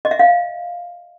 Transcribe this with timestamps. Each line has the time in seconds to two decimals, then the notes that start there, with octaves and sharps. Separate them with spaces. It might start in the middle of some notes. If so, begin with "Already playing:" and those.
0.05 D#5
0.11 E5
0.19 F5